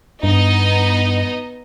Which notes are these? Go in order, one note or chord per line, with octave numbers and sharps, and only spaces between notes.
G2 B3 D#4 D#5